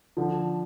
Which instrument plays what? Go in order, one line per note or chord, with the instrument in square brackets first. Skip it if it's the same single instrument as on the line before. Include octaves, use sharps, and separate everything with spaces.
[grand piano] D3 F3